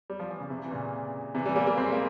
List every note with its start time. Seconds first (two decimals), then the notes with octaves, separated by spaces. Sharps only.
0.10 G3
0.20 F3
0.29 E3
0.40 C#3
0.50 C3
0.64 E3
0.71 A#2 C#3
1.35 C3 E3
1.46 E3 G3
1.56 G3 A#3
1.67 G3 A#3
1.77 G#3 C4
1.92 A#3